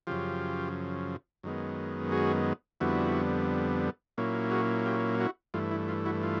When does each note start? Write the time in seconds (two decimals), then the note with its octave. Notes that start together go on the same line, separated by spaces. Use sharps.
0.07 F#2 C#3 F3 F4 G4
1.43 F#2 D#3 G#3 B3
2.12 F#4 G#4
2.80 F2 D3 G3 B3 E4 F#4
4.18 A#2 F#3 A#3 C#4 E4
4.51 F#4 G#4
4.86 F4 G4
5.19 E4 F#4
5.54 G2 E3 A3 F4
5.71 E4
5.88 F4
6.05 E4 F#4
6.23 F4